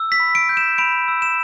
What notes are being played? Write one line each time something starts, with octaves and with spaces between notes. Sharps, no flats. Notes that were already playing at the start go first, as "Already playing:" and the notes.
Already playing: E6
B6
B5
D7
G6
E7
B5 D7
E6
E7